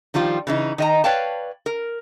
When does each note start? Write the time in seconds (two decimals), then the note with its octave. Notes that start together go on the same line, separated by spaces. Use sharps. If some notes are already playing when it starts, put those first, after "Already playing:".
0.14 D#3 F3 G3 F4
0.47 C#3 E3 D#4
0.78 D#3 D#5 A#5
1.04 B4 C#5 D5 F5 G5 A5
1.66 A#4